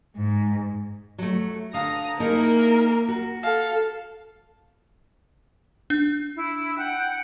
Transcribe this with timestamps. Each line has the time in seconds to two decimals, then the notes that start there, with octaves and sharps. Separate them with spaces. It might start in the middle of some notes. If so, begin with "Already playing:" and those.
0.15 G#2
1.18 F#3 A3
1.74 D3 F5 A#5 D#6
2.20 A#3 D#4 E4 G#4 A#4
3.08 F#4
3.43 A4 F5
5.90 D4
6.35 E4
6.78 F#5 G5 F#6